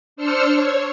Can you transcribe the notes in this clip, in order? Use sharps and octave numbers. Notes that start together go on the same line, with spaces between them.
D4 C5 E6 F6 C#7
C#5